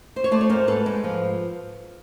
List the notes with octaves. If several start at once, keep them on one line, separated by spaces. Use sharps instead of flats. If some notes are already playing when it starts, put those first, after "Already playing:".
C5
C#5
A3 C5 D5
C#5
G#2 A#4 C5
G#2 A4 B4
G#2
F3